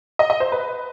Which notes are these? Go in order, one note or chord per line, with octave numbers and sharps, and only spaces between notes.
D#5
D#5
C5
B4